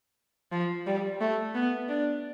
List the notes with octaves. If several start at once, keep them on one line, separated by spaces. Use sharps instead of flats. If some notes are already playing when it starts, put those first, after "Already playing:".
F3
G3
A3
B3
D4